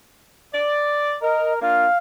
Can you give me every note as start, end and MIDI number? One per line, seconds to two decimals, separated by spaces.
0.54 1.14 74
1.22 1.58 70
1.22 1.54 75
1.61 1.87 58
1.61 1.87 62
1.61 1.87 65
1.61 1.98 77